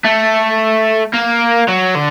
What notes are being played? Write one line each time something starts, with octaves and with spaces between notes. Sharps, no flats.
A3
A#3
F#3
D3